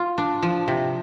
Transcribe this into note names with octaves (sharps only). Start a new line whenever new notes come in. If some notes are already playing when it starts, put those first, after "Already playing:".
Already playing: F4
D4
F3
C3